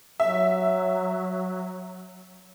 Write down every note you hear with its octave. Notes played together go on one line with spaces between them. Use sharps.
F#3 E5